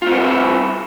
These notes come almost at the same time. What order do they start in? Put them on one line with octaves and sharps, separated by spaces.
F4 C4 B3 G3 E4